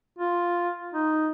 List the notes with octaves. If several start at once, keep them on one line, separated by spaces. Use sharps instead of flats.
F4
D#4